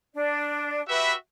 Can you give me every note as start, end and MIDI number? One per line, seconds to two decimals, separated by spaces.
0.15 0.82 62
0.15 0.82 74
0.88 1.14 66
0.88 1.14 67
0.88 1.13 71
0.88 1.14 76